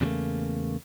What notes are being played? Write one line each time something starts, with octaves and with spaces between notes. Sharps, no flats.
E2 C#3 E3 G3 A3 A#3